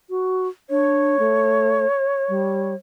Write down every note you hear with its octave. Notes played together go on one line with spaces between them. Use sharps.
F#4
D4 C#5
A3
G3